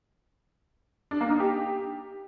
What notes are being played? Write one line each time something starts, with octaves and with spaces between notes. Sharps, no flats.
D4
A#3
D#4
G4